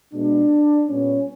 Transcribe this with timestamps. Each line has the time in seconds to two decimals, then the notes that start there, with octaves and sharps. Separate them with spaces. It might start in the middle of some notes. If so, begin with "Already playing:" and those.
0.13 B2 G#3 B3 D4
0.87 A#2 G3 B3 C#4